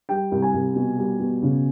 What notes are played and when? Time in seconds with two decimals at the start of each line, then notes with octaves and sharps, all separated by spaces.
0.09 G3 G5
0.32 C2
0.42 G#5
0.54 C2
0.76 B2
0.98 G3
1.20 B2
1.42 C#3